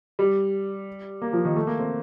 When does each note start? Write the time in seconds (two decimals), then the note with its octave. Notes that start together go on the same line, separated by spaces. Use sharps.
0.19 G3
1.22 A#3
1.33 F3
1.45 D#3
1.56 A3
1.67 A#3
1.79 C4